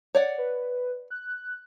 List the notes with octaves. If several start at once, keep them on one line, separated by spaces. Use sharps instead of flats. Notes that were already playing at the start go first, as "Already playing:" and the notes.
C#5 D5 F#5
B4
F#6